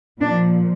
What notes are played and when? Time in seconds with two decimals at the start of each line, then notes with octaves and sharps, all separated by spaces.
0.21 A#2 F3 D4